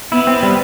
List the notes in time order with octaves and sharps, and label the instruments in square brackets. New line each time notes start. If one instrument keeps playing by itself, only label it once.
[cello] B3 [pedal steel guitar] E4
[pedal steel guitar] C4
G3